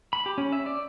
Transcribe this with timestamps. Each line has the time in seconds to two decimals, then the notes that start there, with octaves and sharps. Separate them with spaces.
0.13 B5
0.26 G4
0.38 C#4
0.52 E5
0.66 D5